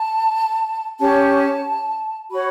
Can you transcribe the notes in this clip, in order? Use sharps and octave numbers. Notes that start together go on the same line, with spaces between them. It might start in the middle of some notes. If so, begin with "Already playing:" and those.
Already playing: A5
C#4 G4 C#5 A5
F#4 C#5 B5